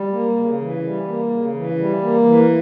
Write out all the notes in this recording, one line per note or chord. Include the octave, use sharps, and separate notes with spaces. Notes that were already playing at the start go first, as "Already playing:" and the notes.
Already playing: G3
A#3
C#3
E3
G3
A#3
C#3
E3
G3
A#3
E3